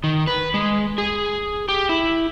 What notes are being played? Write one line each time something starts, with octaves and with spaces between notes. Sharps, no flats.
D#3
B4
G#3
G#4
G4
E4